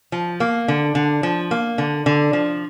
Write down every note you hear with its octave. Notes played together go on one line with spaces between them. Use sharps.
F3
A#3
D3
D3
F3
A#3
D3
D3
F3